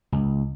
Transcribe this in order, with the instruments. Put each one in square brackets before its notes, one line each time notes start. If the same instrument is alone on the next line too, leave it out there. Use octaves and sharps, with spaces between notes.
[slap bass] C#2